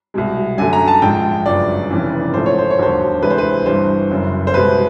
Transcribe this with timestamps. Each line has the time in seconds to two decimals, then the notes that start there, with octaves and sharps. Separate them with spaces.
0.14 C2 B2 G#3
0.58 F#2 D3 F#3 A3 G#5
0.73 A#5
0.88 A5
1.02 A#1 G#2 F3 G#3 G5
1.46 G1 F#2 C#3 F3 G#3 D5
1.90 F1 F2 C#3 E3
2.34 A#1 G#2 F3 A3 C5
2.46 C#5
2.59 C5
2.70 C#5
2.79 E1 D#2 D3 F#3 C5
3.22 D2 C3 E3 G#3 B4
3.30 C5
3.38 B4
3.66 G1 G2 E3 G3 C5
4.11 F#1 F#2 C#3
4.47 C5
4.54 C2 B2 G#3 B4